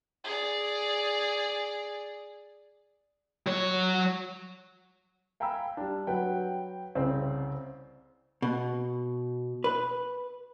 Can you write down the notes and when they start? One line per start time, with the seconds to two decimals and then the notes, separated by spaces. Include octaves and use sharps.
0.24 G#4 D5
3.46 F#3 C#5
5.40 F5 G5 G#5 A#5 B5 E6
5.77 G3 D4
6.07 F#3 B4 G5
6.95 C2 C#3 C4 C5
8.42 B2
9.64 B4